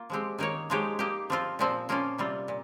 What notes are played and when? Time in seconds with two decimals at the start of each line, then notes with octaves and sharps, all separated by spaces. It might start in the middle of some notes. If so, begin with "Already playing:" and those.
Already playing: A#3 F4
0.10 F3 G#3 C4 G4
0.38 D#3 A#3 D#4 A#4 C#5
0.70 F3 G#3 D#4 G4 C#5
0.99 A#3 D#4 G4
1.30 F3 C4 F4
1.59 A#2 F3 C4
1.89 F3 A#3 C#4 F4
2.18 C3 G3 C4 F4
2.48 A#2